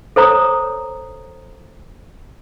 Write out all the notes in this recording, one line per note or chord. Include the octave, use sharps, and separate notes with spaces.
A4 C5 C#5 A#5 D#6